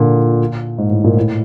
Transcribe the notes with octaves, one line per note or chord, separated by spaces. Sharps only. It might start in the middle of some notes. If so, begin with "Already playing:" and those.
Already playing: A#2 D3
G#2
A2
A#2
A2